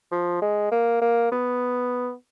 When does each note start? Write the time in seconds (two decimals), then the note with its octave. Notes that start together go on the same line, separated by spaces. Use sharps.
0.12 F3
0.42 G#3
0.71 A#3
1.01 A#3
1.32 B3